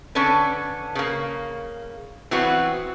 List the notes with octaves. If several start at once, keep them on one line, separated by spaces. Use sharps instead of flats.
D3 C#4 A4 B4
C#3 A#3
E3 F#3 B3 C4 F#4